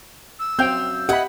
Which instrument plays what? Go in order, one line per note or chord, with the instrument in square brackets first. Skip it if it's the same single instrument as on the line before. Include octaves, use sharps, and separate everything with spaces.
[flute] E6
[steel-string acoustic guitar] F#2 F5 [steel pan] C4 G5 [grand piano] G6
[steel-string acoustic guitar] E4 D#5 [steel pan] G4 B5 [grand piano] F#5